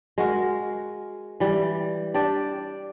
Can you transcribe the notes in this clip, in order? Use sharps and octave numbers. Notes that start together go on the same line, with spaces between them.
G#3 F#4 A#4
E3 G3
D4 G4 D5